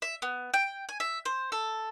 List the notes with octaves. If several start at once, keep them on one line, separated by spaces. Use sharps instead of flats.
E5
B3
G5
G#5
E5
C5
A4